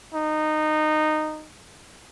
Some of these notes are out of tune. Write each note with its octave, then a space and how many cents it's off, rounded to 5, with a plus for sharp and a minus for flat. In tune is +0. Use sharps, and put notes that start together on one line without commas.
D#4 -15